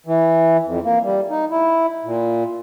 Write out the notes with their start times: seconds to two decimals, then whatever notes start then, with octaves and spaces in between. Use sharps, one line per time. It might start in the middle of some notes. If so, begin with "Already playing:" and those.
0.06 E3
0.64 F2
0.84 A#3
1.03 G3
1.30 D#4
1.51 E4
2.04 A#2